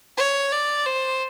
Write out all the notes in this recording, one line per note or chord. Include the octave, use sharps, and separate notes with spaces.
C#5
D5
C5